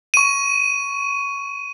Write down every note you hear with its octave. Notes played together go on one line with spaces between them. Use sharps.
C#6 D#7